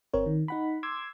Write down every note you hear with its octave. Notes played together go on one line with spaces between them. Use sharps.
G1 C4 A#4 C#5
D#3
D#4 F#5 B5
C6 D6 E6 G#6